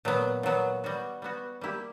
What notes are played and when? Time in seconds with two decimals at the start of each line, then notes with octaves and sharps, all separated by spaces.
0.05 A#2 F#3 B3
0.43 A#2 F#3 B3
0.84 G3 B3 F#4
1.22 G3 B3 F#4
1.61 G3 A#3 E4 G4